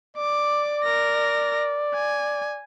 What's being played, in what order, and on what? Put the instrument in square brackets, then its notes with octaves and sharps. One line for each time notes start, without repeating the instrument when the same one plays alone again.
[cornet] D5 [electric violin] D6
[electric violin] A#4 A#6
G#5